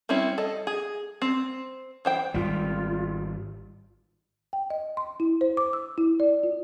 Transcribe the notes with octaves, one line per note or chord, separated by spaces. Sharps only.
G3 C4 C#4 E4
A4 D#5
G#4
C4
E3 C5 G5
G#1 G3 F4
G5
D#5
C6
E4
C5
D6
E6
E4
D5
F4